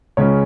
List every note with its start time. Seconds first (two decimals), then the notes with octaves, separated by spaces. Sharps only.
0.17 C#2 C#3 G#3 C#4 C#5